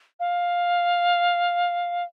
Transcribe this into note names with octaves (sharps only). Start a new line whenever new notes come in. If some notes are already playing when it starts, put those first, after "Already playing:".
F5